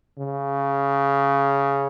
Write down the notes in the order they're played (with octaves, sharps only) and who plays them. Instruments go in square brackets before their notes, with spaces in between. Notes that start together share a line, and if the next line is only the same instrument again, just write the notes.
[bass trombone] C#3